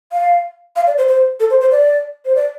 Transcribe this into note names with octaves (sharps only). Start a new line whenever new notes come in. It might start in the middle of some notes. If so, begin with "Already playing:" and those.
F5
F5
D5
C5
C5
A4
C5
C5
D5
C5
D5